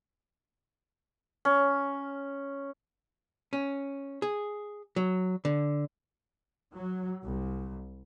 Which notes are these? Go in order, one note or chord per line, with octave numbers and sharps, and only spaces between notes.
C#4
C#4
G#4
F#3
D3
F#3
C2